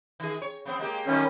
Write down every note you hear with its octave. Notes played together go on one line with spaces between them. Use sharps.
D#3 G#4
C#5
C#3 B3 C4
G#3 A#3 G4
D#3 F#3 G3 A3 C#4